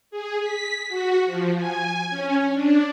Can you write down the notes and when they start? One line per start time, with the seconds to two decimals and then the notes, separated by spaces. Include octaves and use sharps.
0.11 G#4
0.41 B6
0.89 F#4
1.26 F3
1.57 G#5
2.10 C#4
2.53 D4